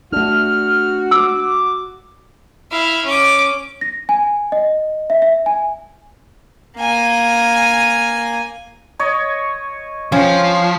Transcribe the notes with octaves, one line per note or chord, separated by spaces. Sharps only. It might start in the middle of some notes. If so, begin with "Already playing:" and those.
A3 D4 F#4 F6
D6 E6
E4 F5
C#4 D6
A#6
G#5
D#5
E5
E5
G#5
A#3 G#5
C#5 D#5
F3 C#4 F5 G5